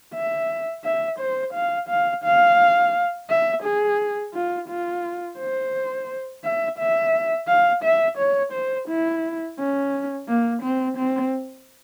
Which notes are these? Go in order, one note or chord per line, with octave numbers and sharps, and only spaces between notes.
E5
E5
C5
F5
F5
F5
E5
G#4
F4
F4
C5
E5
E5
F5
E5
C#5
C5
E4
C#4
A#3
C4
C4